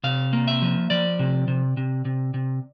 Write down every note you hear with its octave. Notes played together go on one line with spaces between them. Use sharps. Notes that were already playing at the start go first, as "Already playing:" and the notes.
C3 F5
A#3
E5
F3
F3 D5
C3
C3
C3
C3
C3